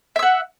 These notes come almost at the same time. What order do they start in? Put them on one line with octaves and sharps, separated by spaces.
E5 E6 F#5